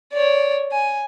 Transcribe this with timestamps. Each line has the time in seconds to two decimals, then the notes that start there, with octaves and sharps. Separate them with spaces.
0.13 C#5 D5
0.72 G#5